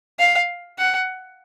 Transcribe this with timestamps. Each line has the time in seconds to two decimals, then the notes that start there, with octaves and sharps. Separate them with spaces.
0.20 F5
0.79 F#5